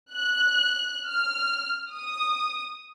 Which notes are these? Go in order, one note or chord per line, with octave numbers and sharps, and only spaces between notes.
F#6
F6
D#6